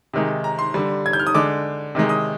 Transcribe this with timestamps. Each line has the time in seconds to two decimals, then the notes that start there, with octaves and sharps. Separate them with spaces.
0.13 C3 D#3 G#3
0.44 A#5
0.59 C6
0.74 D3 G3
1.06 G#6
1.13 G6
1.19 F6
1.27 D#6
1.35 D3 G#3 D6
1.95 C3 D#3 G#3
2.09 D#6